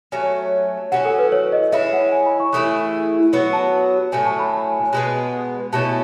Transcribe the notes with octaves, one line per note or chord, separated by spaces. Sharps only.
F#3 A3 C#4 G#5
F#3 C#4 E4 F#5
A4
B4
C#5
D#5
G#3 C#4 E4 E5
F#5
G#5
B5
C#6
E3 A3 E4 G#4 D#6
F#3 B3 F#4
A5
A2 F#3 A3 C#4 G#5
A5
B5
A5
G#5
G#5
B2 G#3 B3
B2 A3 C#4 E4 A5